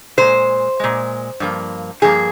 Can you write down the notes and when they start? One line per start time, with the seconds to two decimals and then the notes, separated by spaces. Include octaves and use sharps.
0.17 A#2 G#3 C5
0.80 A#2 G#3
1.40 G2 F3 A#3
2.02 G2 F3 A#3 G#4